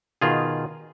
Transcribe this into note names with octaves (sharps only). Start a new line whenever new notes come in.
B2 D#3 F4 G#4